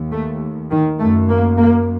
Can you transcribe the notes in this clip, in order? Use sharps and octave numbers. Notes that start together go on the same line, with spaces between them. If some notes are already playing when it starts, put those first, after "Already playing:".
Already playing: D#2
A3
D#3
F#2 A3
A#3
A#3